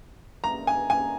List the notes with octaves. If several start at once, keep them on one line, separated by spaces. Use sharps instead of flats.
A#5
G#5
G#5